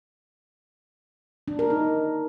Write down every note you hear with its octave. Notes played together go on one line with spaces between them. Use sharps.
D4
A#4
D#4